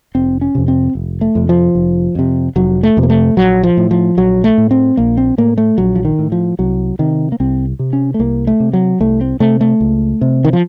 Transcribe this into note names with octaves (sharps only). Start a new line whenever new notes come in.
F1 C4
C#4
F2 C3
C4
F1
A3
F2 C3
F3
F1
F2 C3
F1 F#3
A3
F2 C3
A#3
A3
A#1 F#3
F3
A2
F3
A#1 F#3
A3
A2
C4
A#1 A#3
C4
A2 A#3
A3
A#1 F#3
F3
D#3
A2
F3
C2 F#3
C3 D#3
A#3
C2 C4
C3
C#4
A3
C2 A#3
A3
C3
F#3
C2 A3
C4
C3 A3
A3
C#2
C3
D#3
F3